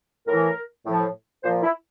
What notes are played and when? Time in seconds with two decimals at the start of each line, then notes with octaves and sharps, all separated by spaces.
0.28 A2 E3 A#4
0.85 A2 F3
1.44 A#2 F3 C5
1.63 E4